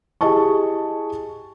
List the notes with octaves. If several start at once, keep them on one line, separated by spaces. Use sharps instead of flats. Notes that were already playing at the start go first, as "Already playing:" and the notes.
E4 G4 G#4 D#5 A5 C#6